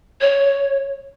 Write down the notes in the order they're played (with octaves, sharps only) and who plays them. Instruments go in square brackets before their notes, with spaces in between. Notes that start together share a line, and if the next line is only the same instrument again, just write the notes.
[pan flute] C#5